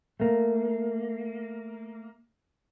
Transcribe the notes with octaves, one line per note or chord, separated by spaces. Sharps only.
A3 A#3